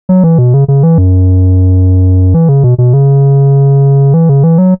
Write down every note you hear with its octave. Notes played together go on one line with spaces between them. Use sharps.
F#3
E3
B2
C#3
C#3
E3
F#2
E3
C#3
B2
B2
C#3
E3
C#3
E3
F#3